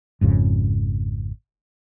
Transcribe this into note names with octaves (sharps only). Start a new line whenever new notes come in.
G#1 F2 G#2 C#3